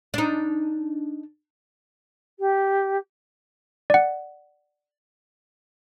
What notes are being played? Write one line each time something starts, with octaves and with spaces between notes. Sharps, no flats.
D4 D#4
G4
D5 F#5